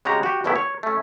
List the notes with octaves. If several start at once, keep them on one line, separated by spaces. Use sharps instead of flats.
C#3 G#3 F#4 G4 A#5
F#4 G4
B1 E2 B2 D#3 F3 E4
C#5
A3 C#4